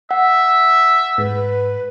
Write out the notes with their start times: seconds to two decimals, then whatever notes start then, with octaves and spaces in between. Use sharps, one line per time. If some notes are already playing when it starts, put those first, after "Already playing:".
0.11 E5 F#5
1.18 G#2 B4